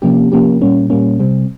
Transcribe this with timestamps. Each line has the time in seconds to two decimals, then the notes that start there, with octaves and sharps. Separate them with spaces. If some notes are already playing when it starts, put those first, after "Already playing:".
0.02 C3 F3 A#3 C#4 G4
0.32 C3 F3 A#3 C#4 G4
0.61 A#2 G3 A#3 C#4
0.90 A#2 G3 A#3 C#4
1.20 C3 G3 C4